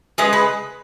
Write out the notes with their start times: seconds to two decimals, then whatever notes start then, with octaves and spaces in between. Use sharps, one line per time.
0.18 G#3 G#4 B4
0.33 B4